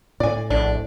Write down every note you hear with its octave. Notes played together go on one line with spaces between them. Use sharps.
A2 D5 G#5
A#1 D4